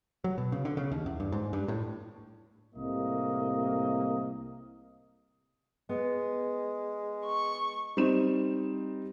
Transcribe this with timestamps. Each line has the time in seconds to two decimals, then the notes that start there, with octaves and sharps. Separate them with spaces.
0.24 F#3
0.38 B2
0.52 C#3
0.65 D3
0.77 C#3
0.92 D#2
1.06 E2
1.20 G2
1.32 G#2
1.53 G2
1.68 A2
2.75 C2 A2 C3 A#3 D#5
5.89 G#3 B3
7.26 C#6
7.97 G3 C4 D#4 E7